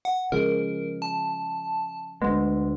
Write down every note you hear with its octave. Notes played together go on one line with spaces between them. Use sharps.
F#5
C#3 F3 G#3 A#4
A5
D2 G#3 A#3 B3